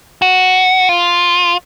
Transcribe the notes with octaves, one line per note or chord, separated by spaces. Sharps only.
F#4
F4